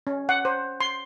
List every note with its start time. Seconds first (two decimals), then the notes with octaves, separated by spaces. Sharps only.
0.07 C#4
0.29 F#5
0.45 C5
0.80 C6